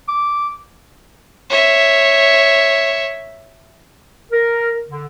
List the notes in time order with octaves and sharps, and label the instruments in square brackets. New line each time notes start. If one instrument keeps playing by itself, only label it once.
[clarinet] D6
[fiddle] C#5 E5
[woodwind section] A#4
D3